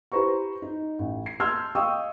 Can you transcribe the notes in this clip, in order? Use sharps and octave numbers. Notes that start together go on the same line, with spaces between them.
E4 G4 B4 C5 A#5 C#6
D#4
A1
C7
A5 C6 E6 F6 G6 G#6
D#5 F5 G5 C#6 D#6 E6